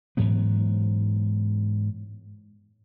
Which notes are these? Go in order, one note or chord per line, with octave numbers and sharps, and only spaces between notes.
G#2 E3 F#3 B3